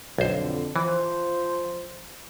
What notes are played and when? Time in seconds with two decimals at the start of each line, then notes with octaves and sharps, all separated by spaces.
0.18 B1 F2 D3 C5
0.76 E3 F3 C5